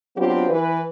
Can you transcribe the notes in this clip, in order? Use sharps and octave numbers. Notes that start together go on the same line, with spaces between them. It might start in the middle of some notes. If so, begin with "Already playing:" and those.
F#3 B3 C4 D4 F4 G4
E3 B4